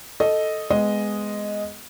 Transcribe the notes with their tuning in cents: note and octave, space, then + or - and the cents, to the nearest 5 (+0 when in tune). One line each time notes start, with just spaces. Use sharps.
A4 +0 D#5 +0
G#3 +0 B3 +20 D#5 +0